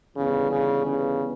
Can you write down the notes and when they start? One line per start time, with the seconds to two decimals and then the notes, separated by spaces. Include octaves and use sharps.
0.16 G1 G2 C#3 E3 G3 B3
0.51 C#3
0.86 C#3